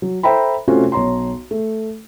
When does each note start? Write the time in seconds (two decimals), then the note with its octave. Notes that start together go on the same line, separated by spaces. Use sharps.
0.02 F#3
0.23 A4 C5 E5 G5 A#5 B5
0.68 C3 A3 C#4 F4 F#4 C5
0.92 B1 C#5 A#5 C6
1.51 A3